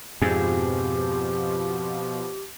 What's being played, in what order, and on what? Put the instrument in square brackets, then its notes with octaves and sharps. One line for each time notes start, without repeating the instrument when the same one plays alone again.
[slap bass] F2 G#2 [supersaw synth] B2 F3 [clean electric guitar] C4 G#4 [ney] G4